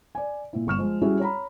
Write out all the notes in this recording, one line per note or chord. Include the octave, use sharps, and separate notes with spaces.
D5 G#5
A#2 E4
G1 C#6 F6 E7
F3 G#3
G3 C#4 E4 F#4 G#4
C#5 A#5 B5